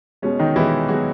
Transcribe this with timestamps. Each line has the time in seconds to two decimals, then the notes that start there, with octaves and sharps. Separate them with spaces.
0.22 B2 G#3 C#4
0.39 D#3 D#4
0.56 B2 E3 G#3 E4
0.88 B2 F#3 G#3 F#4